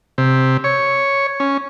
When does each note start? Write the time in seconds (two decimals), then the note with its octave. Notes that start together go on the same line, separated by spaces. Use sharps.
0.18 C3
0.64 C#5
1.40 C#4